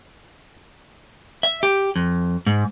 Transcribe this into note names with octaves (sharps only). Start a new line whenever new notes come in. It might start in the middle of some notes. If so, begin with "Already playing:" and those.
E5
G4
F2
G#2